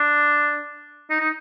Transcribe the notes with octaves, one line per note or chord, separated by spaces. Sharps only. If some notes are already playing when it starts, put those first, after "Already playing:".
Already playing: D4
D#4
D#4